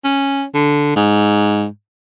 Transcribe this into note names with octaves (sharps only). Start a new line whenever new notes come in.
C#4
D3
G#2